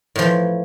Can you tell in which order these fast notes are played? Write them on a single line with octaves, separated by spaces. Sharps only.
A2 F3 E3